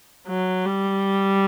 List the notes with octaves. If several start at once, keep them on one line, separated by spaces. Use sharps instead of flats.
F#3
G3